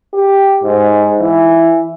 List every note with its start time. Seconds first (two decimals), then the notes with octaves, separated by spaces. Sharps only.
0.14 G4
0.63 G#2
1.20 E3